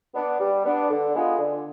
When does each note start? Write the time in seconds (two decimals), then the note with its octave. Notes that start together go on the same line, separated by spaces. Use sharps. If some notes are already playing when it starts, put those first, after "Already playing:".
0.15 B3 D4
0.40 G3
0.65 B3 D4
0.90 D3
1.14 G#3 B3 F4 G#4
1.39 D3